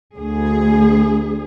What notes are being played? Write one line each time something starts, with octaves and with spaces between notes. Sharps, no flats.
D2 G#4